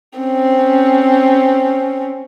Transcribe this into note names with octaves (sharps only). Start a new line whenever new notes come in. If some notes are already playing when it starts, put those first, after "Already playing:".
C4 C#4